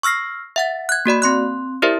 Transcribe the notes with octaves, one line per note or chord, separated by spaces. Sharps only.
C#6 E6 F6 A#6 C7
E5 F#5 A6
F#6 G#6
A#3 F#4 D5 B5
C4 C6 F#6
E4 G4 A#4 C5 D5 E5